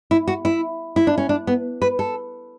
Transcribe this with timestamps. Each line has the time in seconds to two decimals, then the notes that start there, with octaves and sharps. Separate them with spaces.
0.11 E4
0.28 F#4
0.45 E4
0.96 E4
1.07 D4
1.18 C#4
1.29 D4
1.47 B3
1.82 B4
1.99 A4